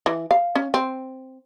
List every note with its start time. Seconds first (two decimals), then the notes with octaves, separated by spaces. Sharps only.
0.06 E3
0.31 F5
0.55 C#4
0.74 C4